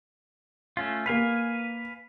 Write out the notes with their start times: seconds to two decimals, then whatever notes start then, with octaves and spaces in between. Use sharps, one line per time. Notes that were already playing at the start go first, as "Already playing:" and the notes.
0.77 A3 C#4 F4
1.06 A#3 B4 F5 G#5 C7